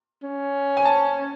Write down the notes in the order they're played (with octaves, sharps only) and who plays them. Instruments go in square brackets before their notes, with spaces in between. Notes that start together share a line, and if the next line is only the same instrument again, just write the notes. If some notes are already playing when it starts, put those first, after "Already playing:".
[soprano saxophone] C#4
[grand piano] G#5
A5